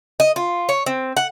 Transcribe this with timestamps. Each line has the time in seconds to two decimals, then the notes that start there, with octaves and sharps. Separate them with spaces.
0.20 D#5
0.36 F4
0.69 C#5
0.86 C4
1.17 F#5